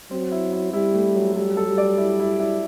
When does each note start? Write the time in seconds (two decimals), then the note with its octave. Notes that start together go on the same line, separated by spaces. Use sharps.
0.11 F#3 C4
0.32 E4
0.53 E4
0.73 G3 E4
0.94 A3
1.16 F#3
1.35 G3 A4
1.57 A4
1.67 G3
1.78 D5
1.98 E4
2.20 E4
2.40 E4